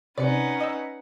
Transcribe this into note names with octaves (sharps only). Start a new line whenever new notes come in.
C3 C#4 D#4 B4 D5 F#5 C#7
D#5 E6